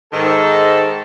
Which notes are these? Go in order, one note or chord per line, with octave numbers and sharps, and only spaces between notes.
G#2 D#3 A4